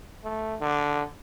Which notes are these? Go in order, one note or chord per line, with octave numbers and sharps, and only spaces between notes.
A3
D3